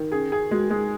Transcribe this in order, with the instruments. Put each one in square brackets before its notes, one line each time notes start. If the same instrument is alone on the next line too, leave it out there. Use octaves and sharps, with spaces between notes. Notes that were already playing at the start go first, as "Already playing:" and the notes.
Already playing: [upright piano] D#3
[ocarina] C#4 [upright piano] G#4
[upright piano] G#4
[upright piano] G#3 [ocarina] F#4
[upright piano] G#3 [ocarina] G#4